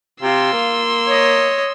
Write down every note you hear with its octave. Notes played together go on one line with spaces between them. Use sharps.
C3 F4 C6 E6
A#3
C#5 D#5